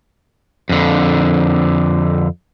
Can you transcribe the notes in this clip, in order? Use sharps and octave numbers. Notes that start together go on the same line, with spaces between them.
F2 D3